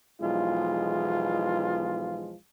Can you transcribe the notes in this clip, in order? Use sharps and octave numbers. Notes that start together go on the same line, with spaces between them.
B1 E2 E3 F3 G#3 F4